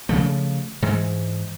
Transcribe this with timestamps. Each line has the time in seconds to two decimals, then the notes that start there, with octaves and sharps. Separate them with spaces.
0.09 C#3 F3 A3
0.82 G#2 E3 G#3